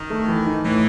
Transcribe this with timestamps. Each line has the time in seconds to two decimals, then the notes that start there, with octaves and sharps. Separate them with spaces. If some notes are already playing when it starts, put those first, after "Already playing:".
Already playing: D#3
0.10 A3
0.28 E3
0.47 D#4
0.64 A2 E3